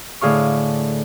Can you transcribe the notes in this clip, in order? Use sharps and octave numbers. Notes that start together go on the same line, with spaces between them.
A2 D3 G#4 F5 C#6